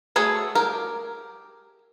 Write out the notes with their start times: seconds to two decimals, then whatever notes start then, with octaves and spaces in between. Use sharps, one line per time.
0.16 A3 F#4 G#4 A4 C#5
0.55 G4 A#4